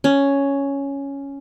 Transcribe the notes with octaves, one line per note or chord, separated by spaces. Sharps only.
C#4